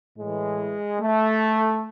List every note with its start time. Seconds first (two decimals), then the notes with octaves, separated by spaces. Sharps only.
0.18 A2 E3 G#3
1.00 A3